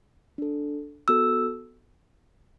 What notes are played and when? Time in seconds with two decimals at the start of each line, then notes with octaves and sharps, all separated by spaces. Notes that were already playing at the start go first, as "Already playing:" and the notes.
0.38 D4 A4
1.08 B3 F#4 A4 E6